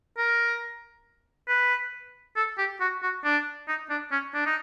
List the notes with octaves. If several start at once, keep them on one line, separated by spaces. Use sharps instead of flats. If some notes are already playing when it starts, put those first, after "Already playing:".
A#4
B4
A4
G4
F#4
F#4
D4
D#4
D4
C#4
D4
D#4